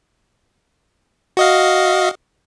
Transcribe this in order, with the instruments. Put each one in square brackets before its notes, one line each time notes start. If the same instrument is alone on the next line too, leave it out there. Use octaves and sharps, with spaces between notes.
[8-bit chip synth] F#4 D#5 F5